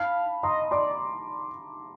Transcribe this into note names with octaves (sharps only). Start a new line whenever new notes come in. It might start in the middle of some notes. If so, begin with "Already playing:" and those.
Already playing: F5 A5 B5
D#5 A#5 C6
D5 C6 D6